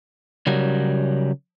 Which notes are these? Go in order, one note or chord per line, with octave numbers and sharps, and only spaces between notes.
C#3 F#3 G3 A#4